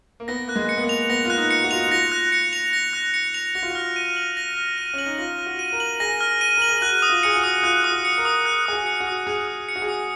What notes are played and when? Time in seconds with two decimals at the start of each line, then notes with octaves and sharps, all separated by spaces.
0.20 A#3
0.28 B3 A#6
0.48 A#3 F#6
0.56 G#3
0.69 C#7
0.78 B3
0.83 A#3
0.89 F7
1.10 B3 A#6
1.25 F4 F#6
1.37 D#4
1.51 C#7
1.64 F#4
1.71 F4 F7
1.80 D#4
1.88 F4 A#6
2.12 F#6
2.32 C#7
2.53 F7
2.73 A#6
2.93 F#6
3.14 C#7
3.34 F7
3.55 F#4 A#6
3.62 F4
3.70 F#4
3.75 F6
3.96 D#7
4.16 F#7
4.37 A#6
4.57 F6
4.78 D#7
4.94 C#4 F#7
5.06 D#4
5.18 F4 A#6
5.39 F6
5.46 F#4
5.59 D#7
5.72 A#4
5.80 F#7
6.00 G#4 A#6
6.21 F6
6.41 D#7
6.57 A#4 F#7
6.70 G#4
6.81 F#4 F#6
7.02 D#6
7.10 F4
7.23 G#4 C#7
7.36 F#4
7.44 D#6
7.63 F4 F#6
7.84 D#6
7.91 F#4
8.05 C#7
8.18 A#4
8.25 D#6
8.46 F#6
8.66 G#4 D#6
8.73 F#4
8.86 C#7
9.00 F#4
9.07 D#6
9.27 G#4 F#6
9.48 D#6
9.69 C#7
9.76 F#4
9.82 G#4
9.89 D#6